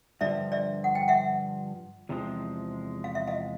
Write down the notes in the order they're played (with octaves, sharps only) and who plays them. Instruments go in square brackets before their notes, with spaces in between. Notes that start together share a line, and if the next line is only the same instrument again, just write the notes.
[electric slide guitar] G2 D3 F3 [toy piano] D5 E5
[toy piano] D5 E5
F#5
G5
E5 F#5
[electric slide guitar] E2 C3 F3 G#3
[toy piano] F5
E5
D#5 F5